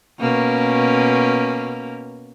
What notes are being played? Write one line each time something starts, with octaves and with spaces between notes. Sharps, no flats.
B2 A#3 C#4